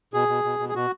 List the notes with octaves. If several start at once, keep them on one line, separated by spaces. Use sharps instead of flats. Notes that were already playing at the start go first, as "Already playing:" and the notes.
B2 G#4
B2
B2
B2
G#4
B2 F#4